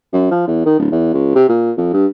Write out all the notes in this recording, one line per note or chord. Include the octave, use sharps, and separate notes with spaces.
F#2
F3
E2
D#3
D1
E2
C#2
C3
A#2
F2
G2